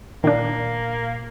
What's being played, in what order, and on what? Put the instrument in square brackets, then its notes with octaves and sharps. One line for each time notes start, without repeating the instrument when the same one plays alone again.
[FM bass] A#2 [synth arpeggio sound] D#3 D4 [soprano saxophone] A#3